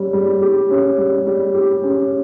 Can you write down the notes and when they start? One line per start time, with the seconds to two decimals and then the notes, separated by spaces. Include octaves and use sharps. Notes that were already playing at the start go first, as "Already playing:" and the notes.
Already playing: G3 C#4
0.13 G3
0.42 G4
0.70 C#4
0.98 G3
1.27 G3
1.54 G4
1.83 C#4